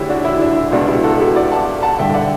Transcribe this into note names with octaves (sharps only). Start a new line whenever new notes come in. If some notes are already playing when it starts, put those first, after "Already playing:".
Already playing: D2 D3 E4 G4 C#5 E5
D4 F#4
E4
D4
E4
C#2 B2 D4 F#4
E4 G4
F#4 A4
E4 G4
D5 F#5
F#5 A5
F#5 A5
G2 D3 E5 G5
D5 F#5